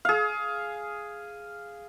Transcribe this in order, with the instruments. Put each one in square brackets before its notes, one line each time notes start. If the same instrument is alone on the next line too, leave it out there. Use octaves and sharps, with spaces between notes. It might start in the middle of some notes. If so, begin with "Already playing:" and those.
[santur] G#4 F5